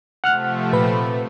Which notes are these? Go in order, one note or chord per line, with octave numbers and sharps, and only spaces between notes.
C3 F3 A3 F#5 F6 F#6
A#2 B4 B5